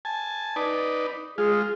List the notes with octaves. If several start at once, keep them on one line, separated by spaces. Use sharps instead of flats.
G#5 A5
D#4 B4 D5
G#3 F4 G#4